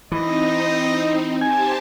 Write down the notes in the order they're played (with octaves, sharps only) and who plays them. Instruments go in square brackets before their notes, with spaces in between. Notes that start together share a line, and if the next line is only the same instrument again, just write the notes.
[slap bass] E3 [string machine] C4 D#4 [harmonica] D#5
[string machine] G4 C5 A5 [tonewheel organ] G#5